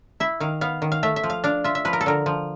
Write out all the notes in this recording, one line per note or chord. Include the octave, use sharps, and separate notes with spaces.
E4 E5
D#3 F5
B3 F5
D#3
F5
A3 E5
E5
F3
F5
D4 F5
F4 E5
E5
F3 B4
A#4
A4
D3 A#4
F3